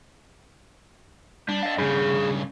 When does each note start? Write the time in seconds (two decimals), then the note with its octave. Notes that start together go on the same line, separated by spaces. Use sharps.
1.49 G3 D4
1.63 D#5 F5
1.78 G2 C#3 G#4 B5